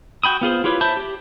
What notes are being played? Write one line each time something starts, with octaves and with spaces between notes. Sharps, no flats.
F#4 G5 B5 D#6
B3 F4 G#4 C5
E4 F4 G4 B4 C#5
C5 E5 A5 B5 G6
G4